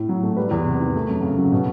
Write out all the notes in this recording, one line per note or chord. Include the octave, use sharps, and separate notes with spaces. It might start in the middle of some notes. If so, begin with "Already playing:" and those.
Already playing: A2
F#3
A3
G3 B4
E2
C3
D#3
A3
F#2
C#3
F#3
B2